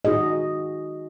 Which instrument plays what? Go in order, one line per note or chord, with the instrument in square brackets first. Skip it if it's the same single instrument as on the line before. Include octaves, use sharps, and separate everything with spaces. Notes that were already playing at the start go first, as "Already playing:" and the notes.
[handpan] D#4 F#4 G#4 D#5